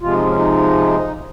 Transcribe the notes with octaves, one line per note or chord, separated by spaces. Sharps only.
C3 F3 G#3 F4
D#4
C#4
D#4